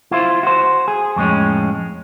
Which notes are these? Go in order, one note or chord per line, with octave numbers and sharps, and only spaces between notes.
E4 F4 C5
F#4 C5
G#4
F2 A2 G#3 C#4